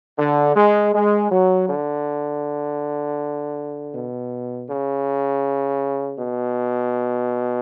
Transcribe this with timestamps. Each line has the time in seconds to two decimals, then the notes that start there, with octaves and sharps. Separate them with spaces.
0.18 D3
0.56 G#3
0.93 G#3
1.31 F#3
1.69 D3
3.94 B2
4.69 C#3
6.19 B2